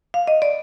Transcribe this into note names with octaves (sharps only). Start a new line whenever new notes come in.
F5
D#5
D5